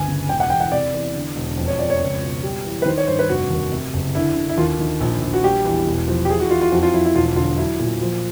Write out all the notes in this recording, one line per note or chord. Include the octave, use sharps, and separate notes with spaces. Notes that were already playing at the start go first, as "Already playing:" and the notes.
Already playing: G1 D2 G#5
C#3
E1 G5
F#5
E2 G5
F#5
C3 D5
E2
D3
E1
F2
C#5
F2 D5
C#5
C#2
B2
G3
E3
B4
D#3 C5
C#5
G2 C5
B4
F1 F#4
D#2
C3
F#1
D3 E4
D3
E4
D#2 F4
D#3
A#1
A#1
F#4
G3 G4
E2
E1
F3
G4
E3 G#4
F#4
E3 F4
F4
F2 F#4
F4
F3 E4
E4
E1 F4
D3 F4
F#3 E4
A#2
F3